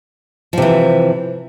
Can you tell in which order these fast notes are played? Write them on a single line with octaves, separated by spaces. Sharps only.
F3 C3 E3